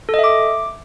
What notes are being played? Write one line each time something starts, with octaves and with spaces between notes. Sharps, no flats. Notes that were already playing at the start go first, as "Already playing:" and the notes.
A4
D#5
E5
D6